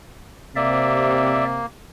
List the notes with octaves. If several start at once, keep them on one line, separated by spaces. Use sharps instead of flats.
C3 A#3 D5 E5